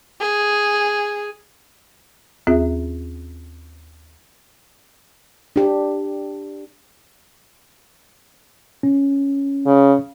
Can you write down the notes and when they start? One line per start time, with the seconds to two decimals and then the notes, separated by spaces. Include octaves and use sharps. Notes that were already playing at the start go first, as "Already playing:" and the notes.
0.20 G#4
2.47 D#2 C4 F4 G#4 E5
5.56 D4 G4
8.83 C#4
9.67 C#3